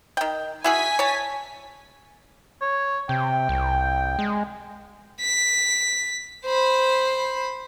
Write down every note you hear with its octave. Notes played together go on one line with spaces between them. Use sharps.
D#3 G5
E4 F#4 G#4 G#5 B6
C#5 A5
C#5
C3 G5
C2
G#3
B6
C5 B5